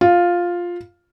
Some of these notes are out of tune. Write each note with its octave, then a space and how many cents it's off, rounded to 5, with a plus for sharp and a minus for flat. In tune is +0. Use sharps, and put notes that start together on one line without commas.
F4 +5